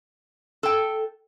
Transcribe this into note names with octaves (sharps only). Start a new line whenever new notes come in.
A4 G5